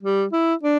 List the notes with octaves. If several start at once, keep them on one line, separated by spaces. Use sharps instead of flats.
G3
E4
D4